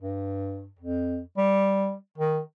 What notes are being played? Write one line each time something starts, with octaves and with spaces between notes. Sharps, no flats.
G2
F2
G3
D#3